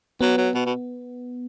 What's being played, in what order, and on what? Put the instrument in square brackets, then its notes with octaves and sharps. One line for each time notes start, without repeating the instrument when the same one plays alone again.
[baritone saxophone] F#3 [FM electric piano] B3
[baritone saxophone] F#3
B2
B2